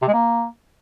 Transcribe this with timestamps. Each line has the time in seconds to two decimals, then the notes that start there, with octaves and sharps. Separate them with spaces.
0.02 C3
0.08 G#3
0.13 A#3